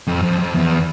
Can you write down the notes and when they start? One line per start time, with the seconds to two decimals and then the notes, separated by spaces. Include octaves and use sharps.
0.07 F2
0.23 F2
0.39 F2
0.55 E2